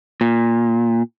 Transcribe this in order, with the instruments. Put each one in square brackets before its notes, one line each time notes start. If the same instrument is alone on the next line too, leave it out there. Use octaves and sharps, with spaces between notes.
[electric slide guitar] A#2